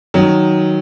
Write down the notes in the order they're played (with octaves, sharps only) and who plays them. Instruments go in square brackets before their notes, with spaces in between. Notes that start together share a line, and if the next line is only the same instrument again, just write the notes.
[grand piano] D#3 F#3